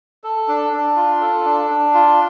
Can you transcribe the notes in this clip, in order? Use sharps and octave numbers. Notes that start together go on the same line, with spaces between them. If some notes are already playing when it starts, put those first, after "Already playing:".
A4
D4
D4
F4
A4
D4
D4
F4